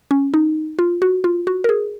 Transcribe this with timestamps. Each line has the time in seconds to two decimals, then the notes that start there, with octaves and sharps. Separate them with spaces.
0.11 C#4
0.34 D#4
0.79 F4
1.02 F#4
1.24 F4
1.47 F#4
1.64 A#4
1.69 G#4